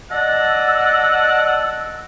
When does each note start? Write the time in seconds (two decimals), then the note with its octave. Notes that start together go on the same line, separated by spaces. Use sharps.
0.11 D5 D#5 F#5 A5 E6